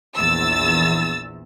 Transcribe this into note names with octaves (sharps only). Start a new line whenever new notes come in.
A#1 E2 E6 A6